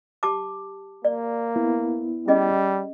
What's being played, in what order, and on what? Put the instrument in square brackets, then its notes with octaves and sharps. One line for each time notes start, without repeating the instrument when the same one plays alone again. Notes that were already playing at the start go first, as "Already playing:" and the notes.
[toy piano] G4 A5 D6
[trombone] A#3 [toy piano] D5
[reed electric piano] B3 E4
[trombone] G3 [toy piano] C#4 G#4 D#5